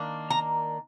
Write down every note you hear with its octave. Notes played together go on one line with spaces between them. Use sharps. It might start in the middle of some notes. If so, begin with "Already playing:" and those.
Already playing: D#3 A#3 D4
A#5